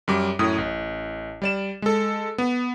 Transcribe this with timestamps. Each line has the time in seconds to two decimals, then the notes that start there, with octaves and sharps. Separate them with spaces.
0.08 F#2 G3 D6
0.39 F#2 A2 D#6
0.58 A1
1.42 G3 D5 E7
1.82 G#3 A4
2.38 B3